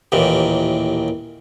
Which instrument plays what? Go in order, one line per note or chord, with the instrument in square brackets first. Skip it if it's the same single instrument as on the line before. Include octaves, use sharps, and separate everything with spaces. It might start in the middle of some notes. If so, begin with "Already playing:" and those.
[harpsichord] A1 D#2 A#2 E3